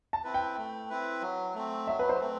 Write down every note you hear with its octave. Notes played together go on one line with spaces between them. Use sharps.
A5
C4 E4 B4
G5
A3
C4 E4 B4
F#3
A3 C4
F#3 E5
B4
C5
A3 C4